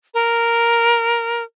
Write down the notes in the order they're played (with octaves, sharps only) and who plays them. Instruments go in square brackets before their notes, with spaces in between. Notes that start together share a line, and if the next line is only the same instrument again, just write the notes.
[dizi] A#4